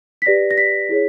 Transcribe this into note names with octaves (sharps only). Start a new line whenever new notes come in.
B6
G4 B4 D5 A#6
A#6
B6
E4 G#4 C#5